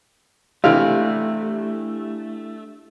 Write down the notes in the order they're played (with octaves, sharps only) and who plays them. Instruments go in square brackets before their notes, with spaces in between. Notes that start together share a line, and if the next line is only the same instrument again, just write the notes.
[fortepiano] C3 E3 [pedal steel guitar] A3 [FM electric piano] D4 E4 G4 [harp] F5